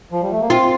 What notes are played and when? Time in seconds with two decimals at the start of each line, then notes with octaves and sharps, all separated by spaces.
0.12 F3
0.22 G3
0.31 A3
0.41 A#3
0.50 C4 F4